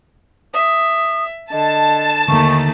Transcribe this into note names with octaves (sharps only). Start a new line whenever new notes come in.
E5 D#6
D3 D#5 A5
D#2 D3 D#3 A3 C#6